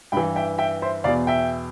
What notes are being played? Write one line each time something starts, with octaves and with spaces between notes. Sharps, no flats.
G2 E3 G5 B5
E5 G5
E5 G5
C5 E5
E2 B2 D5 F5
E5 G5